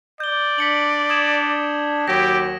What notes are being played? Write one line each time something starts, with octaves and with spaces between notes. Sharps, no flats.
D5 G6 G7
D4 B6 C#7 F#7
D#6 G#6 E7
D#2 F#3 G4 A#6 D7